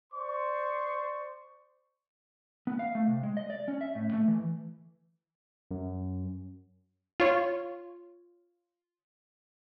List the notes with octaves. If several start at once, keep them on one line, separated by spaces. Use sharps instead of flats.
C5 D5 C6 C#6
B3
F5
A3
C3
G#3
D#5
D5
C#4
E5
A2
A3
E3
F#2
F4 C#5